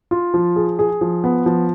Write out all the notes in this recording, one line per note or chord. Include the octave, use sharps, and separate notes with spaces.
F4
F3
G#4
G#4
F3
B3
F3